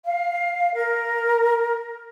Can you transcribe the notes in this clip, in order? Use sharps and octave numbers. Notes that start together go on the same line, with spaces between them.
F5
A#4